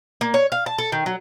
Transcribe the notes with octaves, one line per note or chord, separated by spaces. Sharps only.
A#3
C#5
F5
A5
A4
D#3
F#3